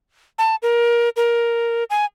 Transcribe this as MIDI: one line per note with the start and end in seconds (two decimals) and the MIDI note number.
0.38 0.56 81
0.63 1.09 70
1.16 1.84 70
1.90 2.05 80